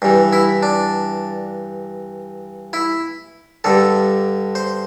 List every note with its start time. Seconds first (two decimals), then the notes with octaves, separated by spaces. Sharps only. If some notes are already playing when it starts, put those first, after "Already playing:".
0.02 G2 E3
0.33 E4
0.63 D4
2.73 E4
3.64 G2 D3 A4
4.55 C5